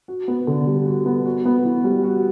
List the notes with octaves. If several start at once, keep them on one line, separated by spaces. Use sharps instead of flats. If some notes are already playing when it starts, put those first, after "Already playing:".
F#4
B3
D3
G3
F#4
B3
F#4
B3
E3
G3
F#4